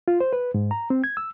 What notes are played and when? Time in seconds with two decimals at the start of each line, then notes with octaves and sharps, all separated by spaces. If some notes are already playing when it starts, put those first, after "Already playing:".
0.08 F4
0.20 C5
0.33 B4
0.54 G#2
0.71 A#5
0.90 C4
1.04 G#6
1.17 E6